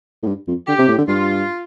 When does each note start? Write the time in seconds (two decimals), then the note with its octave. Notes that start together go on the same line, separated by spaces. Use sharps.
0.23 A2
0.27 G2
0.48 F2
0.68 D3 G4
0.78 C3
0.88 A2
0.98 D3
1.08 G2 F4